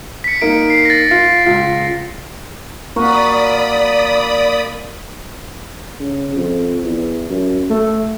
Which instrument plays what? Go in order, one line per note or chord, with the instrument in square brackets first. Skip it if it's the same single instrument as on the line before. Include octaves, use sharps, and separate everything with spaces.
[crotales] B6 C#7
[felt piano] A#3 D#4 [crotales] D7
[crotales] C7
A6 A#6
[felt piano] F4
C#2 F4
[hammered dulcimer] A#3 F#4 F#5 [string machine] D5 B5 D#6
[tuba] C#3
F2
E2
F#2
A3